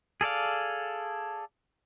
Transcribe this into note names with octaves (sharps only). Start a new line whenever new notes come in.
G#4 A4 D5 F5